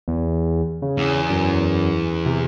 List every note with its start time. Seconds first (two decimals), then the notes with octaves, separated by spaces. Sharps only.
0.08 E2
0.82 C#3
0.97 E2
1.30 F#2
2.26 C3